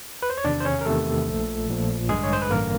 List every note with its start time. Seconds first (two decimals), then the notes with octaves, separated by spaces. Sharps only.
0.23 B4
0.30 C5
0.37 C#5
0.44 E2 C3 D#3 D4 D5
0.60 C5
0.65 C#4 C#5
0.81 A#4
0.85 E2 C3 D#3 A3 A4
1.27 A#1 A#2 F3
1.68 A#1 A#2 F3
2.09 A1 G2 D3 G#3 G#4
2.24 C#5
2.33 C5
2.42 B4
2.51 A1 G2 D3 A#3 A#4